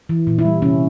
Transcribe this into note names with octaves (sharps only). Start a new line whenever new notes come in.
E3
A#2
E4
G3
C3 C#4